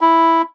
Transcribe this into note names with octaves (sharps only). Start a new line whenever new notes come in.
E4